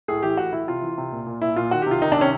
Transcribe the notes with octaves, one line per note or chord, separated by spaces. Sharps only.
A2 G#4
E3 G4
A2 F#4
E3 E4
C3 F4
E3
C3
A#2
A#2
A#2 E4
A#2 F4
D#3 F#4
G4
C3 F4
D#3 D#4
D4
C3 C#4